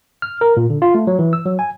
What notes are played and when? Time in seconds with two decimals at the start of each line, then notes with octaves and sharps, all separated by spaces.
0.22 F6
0.41 A#4
0.57 A#2
0.70 D3
0.82 F4
0.95 A3
1.07 F#3
1.19 E3
1.33 E6
1.46 F#3
1.59 G#5